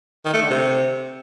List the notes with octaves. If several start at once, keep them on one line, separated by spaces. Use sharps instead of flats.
D#3
A3
D3
C3